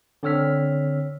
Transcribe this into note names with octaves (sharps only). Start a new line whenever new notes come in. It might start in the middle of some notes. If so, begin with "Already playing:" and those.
D3 C4 C#5 E6 F6 B6